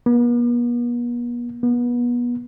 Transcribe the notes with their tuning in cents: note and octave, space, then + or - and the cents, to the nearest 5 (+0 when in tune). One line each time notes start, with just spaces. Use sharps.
B3 -45
B3 -30